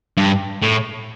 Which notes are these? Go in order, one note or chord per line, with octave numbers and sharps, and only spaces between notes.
G2
A2